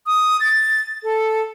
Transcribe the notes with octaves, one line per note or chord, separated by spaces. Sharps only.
D#6
A6
A4